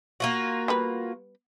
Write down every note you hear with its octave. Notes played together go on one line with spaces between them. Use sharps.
A#3 F4 F#4
G3 B3 B4